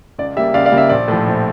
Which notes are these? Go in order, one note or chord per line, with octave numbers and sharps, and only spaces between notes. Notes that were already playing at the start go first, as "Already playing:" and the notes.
C#2 D5
C#3 G3 A#3 E5
C#2 D5 F5
D5 F5
C#3 G3 A#3
E5
A#1 D5
A2 F3
A#1